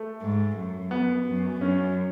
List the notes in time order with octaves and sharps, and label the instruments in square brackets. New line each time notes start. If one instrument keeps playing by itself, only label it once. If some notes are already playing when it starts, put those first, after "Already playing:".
Already playing: [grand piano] A3
[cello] G#2
F#2
[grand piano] B3
[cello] F#2
[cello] F#2 [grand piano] C#4